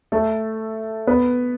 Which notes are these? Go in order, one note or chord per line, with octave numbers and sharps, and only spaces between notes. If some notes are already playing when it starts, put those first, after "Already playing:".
A3 A4
B3 B4